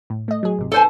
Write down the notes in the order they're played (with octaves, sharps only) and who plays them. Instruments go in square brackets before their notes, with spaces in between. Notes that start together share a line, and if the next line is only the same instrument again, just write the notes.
[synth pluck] A2
A3 D#5
F#3 G#4
G#1 C3
[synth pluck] D#4 B4 [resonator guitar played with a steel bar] A4 C5 G#5